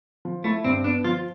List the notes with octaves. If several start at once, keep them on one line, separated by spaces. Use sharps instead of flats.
F3
A3 E4
G2 C4
B3 D4
F3 F4